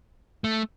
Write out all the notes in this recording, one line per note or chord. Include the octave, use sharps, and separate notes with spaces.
A3